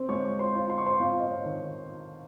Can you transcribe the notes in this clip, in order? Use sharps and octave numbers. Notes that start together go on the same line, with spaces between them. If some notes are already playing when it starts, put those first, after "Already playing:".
Already playing: C4 C5
G#3 C#5 C#6
C5 C6
F4
C6
C#6
C5 C6
C4 F4 F5
D#5
C#5
D#3